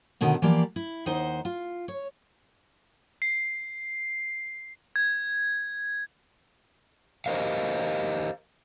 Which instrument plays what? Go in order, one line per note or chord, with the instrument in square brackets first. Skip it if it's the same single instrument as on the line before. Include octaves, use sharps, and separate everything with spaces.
[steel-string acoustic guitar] D#2 B2 D3 D#3
E3 F3 A#3 G4 D5
E4
D#2 D#4 C5 F#5
F4
C#5
[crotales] C7
G#6
[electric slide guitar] G4 A#4 C5 D#5 F5